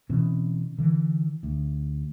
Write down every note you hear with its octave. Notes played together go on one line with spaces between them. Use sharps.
B2 E3 C4 C#4
D3 E3
D2